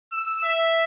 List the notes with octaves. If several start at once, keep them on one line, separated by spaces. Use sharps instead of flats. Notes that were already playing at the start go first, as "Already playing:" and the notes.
E6
E5